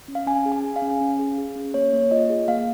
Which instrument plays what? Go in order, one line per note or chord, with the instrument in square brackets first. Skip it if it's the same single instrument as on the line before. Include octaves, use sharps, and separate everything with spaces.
[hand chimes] C#4
F5
C#4 G#5
G#4
G#5
G#4
F5
C#4
C#4
G#4
G#4
C#4
A#3 C#5
A#3
F4 D#5
G#4
A#3 F5